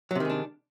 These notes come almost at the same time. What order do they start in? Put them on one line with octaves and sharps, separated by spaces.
F#3 C3 D#3 G#3 D4